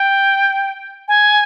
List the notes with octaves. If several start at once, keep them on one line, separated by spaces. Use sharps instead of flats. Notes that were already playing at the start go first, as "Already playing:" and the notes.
Already playing: G5
G#5